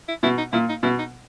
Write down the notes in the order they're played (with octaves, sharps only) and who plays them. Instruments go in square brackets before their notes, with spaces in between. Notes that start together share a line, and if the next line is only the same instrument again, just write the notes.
[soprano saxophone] E4
[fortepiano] B2 [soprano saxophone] E4
[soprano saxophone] D#4
[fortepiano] A#2 [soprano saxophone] E4
[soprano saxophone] D#4
[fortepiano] B2 [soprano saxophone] E4
[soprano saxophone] D#4